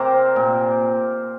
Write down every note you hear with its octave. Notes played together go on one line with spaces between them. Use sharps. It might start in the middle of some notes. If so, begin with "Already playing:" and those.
Already playing: C3 A#4 C5 D5
A#2